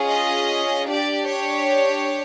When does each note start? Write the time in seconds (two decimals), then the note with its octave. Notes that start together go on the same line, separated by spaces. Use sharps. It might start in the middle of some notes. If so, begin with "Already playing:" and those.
Already playing: C#4 F4 G#4
0.10 D#5
0.88 D4 G4 D5
1.27 C#5